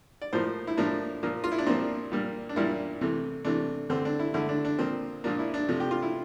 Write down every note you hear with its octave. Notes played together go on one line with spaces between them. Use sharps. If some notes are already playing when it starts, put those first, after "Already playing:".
D5
A2 F3 A#3 C5
E4
A2 F3 A#3 D4
A#2 F3 A#3
F4
E4
D4
A#2 F3 A#3 C4
A#2 G3 A#3
D4
A#2 G3 A#3 E4
C3 E3 A3
C3 E3 A3 D4
D3 A3 C4
D4
E4
D3 A3 E4
D4
D4
A#2 F3 A#3 C4
A#2 F3 A#3 D4
E4
D4
C3 F3 A3
G4
F4
E4